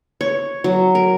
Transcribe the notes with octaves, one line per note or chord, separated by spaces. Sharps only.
C#5
F#3
A#4